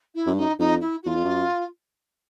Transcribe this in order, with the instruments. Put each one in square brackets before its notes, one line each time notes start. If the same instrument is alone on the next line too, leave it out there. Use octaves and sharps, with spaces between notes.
[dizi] E4
[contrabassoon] F#2
G2
[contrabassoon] F#2 [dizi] D#4
[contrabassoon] F2 [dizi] D#4
[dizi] E4
F#4
[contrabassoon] E2 [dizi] F4
[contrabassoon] F2
F#2